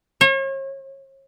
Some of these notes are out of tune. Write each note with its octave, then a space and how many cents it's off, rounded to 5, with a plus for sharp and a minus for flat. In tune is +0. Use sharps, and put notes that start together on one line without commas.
C#5 -40